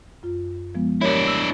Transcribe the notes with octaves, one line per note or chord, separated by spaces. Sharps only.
F#2 F4
F3 G#3 B3
D4 E4 G4 A#4 C#5
E6